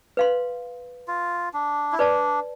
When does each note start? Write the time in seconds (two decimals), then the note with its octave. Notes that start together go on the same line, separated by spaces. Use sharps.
0.17 B4 F5 C6
1.08 F4
1.54 D4
1.92 E4
1.99 D4 B4 D5 A5